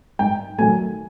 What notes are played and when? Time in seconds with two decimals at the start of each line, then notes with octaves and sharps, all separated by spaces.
0.19 G#2 G5
0.59 D#3 F#3 A3 G#5